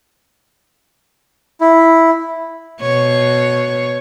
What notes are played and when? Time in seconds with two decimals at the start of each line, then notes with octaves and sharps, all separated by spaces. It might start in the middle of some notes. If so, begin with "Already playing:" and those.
1.61 E4
2.81 B2 C#5